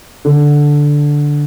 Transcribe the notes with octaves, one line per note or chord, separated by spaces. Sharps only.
D3